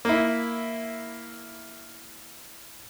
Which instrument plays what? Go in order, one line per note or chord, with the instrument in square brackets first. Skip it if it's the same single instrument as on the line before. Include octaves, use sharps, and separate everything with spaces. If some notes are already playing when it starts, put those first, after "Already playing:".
[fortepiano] A#3 E4